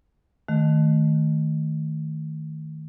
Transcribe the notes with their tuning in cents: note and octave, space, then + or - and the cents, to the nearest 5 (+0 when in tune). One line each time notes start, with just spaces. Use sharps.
D#3 +0 A3 +0